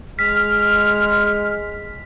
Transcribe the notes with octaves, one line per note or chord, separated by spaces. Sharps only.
G#3 F6 B6